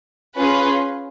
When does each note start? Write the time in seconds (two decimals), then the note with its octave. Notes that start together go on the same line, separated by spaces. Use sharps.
0.38 C#4 F4 G#4 B4